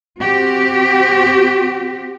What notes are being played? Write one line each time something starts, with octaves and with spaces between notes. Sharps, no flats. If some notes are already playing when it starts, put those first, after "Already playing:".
C4 F#4 G4